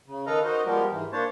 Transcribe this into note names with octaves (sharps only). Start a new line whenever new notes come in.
C#3
D#3 A4 B4 D#5 F5 A#5
D#4 F#4 A#4 C5 D#5
F3 G3 G#3 B3 G4 A#4
G#2 E3
A#3 D4 C5 C#5 A5